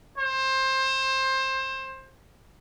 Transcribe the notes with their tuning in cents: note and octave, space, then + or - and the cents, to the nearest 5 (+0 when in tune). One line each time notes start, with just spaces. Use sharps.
C5 +20